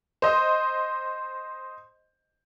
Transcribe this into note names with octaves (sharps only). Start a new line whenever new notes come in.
C5 D#5